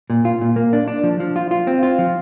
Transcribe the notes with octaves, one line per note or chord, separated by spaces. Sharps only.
A#2
F4
A#2
A#3
D4
D4
F3
F3
F4
F4
C4
F4
F3